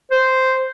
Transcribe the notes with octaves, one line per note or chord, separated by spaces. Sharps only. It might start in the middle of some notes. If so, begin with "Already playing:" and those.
C5